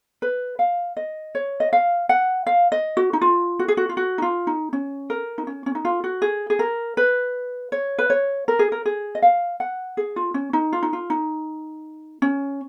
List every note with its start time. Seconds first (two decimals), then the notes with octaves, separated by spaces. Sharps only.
0.22 B4
0.59 F5
0.97 D#5
1.35 C#5
1.60 D#5
1.73 F5
2.09 F#5
2.47 F5
2.72 D#5
2.97 F#4
3.13 D#4
3.22 F4
3.59 F#4
3.68 G#4
3.77 F#4
3.89 F4
3.97 F#4
4.18 D#4
4.22 F4
4.47 D#4
4.73 C#4
5.10 A#4
5.38 D#4
5.47 C#4
5.66 C#4
5.75 D#4
5.85 F4
6.04 F#4
6.22 G#4
6.50 G#4
6.59 A#4
6.97 B4
7.72 C#5
7.99 B4
8.10 C#5
8.48 A#4
8.59 G#4
8.72 A#4
8.86 G#4
9.15 D#5
9.22 F5
9.60 F#5
9.97 G#4
10.16 F4
10.34 C#4
10.53 D#4
10.73 F4
10.83 D#4
10.93 F4
11.10 D#4
12.22 C#4